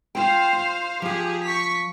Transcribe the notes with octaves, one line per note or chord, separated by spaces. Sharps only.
F4 C5 F5 G5
F4
F3 F4 G4 G#4
C#6 B6